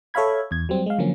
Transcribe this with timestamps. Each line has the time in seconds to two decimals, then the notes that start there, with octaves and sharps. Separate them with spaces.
0.14 A4 C#5 E5 F5 B5 G#6
0.51 E2 G#6
0.69 F#3 G3 C4
0.86 G#3 F5
0.98 D3 F3 F#3 A#3 C#4